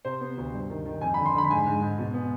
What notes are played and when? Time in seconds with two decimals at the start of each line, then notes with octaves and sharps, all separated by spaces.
0.05 C3 C5
0.21 B3
0.37 D2
0.53 G2
0.70 D#3
0.86 D#3
1.01 F2 G#5
1.14 B5
1.18 D3
1.26 C6
1.34 D3 B5
1.44 B5
1.50 G#2 G#5
1.66 G#2
1.82 G#2
1.98 B2
2.14 B3